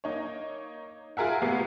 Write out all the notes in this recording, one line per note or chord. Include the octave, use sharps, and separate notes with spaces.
A#3 D#4 C#5
F4 G#4 A#4 E5 F#5
A2 C3 A#3 B3 C7